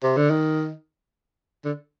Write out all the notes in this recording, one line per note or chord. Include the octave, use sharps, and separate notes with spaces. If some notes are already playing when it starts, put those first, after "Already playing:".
C3
D3
D#3
D3